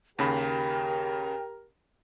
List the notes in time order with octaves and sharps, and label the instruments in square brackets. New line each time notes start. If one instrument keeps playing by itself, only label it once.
[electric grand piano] D#2 C#3 B5 [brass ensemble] G4 A#4 [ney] G5